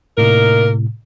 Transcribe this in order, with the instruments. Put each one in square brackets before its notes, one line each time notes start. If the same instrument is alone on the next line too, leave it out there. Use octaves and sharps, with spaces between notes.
[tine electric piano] A2 C3 [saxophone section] A#3 D#4 A#4